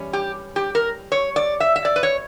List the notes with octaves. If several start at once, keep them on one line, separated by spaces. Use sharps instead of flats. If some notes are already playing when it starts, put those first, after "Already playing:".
Already playing: E3 G3 C#4
G4
G4
A#4
C#5
D5
E5
E5
D5
B4
C#5